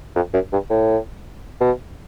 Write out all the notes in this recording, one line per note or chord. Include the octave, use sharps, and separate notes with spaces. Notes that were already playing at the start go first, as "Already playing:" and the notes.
F2
F#2
G2
A2
B2